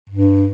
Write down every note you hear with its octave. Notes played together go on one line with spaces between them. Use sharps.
G2